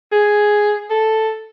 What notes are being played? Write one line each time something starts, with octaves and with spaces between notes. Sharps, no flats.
G#4
A4